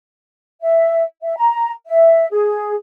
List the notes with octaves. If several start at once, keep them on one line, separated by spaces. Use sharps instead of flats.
E5
E5
A#5
E5
G#4